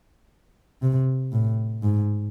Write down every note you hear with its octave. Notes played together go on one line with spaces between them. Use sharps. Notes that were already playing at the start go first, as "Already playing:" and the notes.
C3
A2
G#2